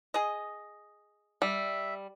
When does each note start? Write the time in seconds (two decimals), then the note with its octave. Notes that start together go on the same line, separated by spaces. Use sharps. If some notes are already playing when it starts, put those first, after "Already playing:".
0.14 G#4 D#5
1.42 G3 E5